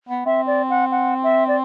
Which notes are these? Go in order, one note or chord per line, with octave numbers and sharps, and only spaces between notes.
B3
C4 E5
D5
F#5
F#5
E5
D5